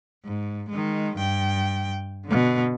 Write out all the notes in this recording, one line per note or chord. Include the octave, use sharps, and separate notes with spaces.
G#2
D#3 G#3
G2 G5
B2 D3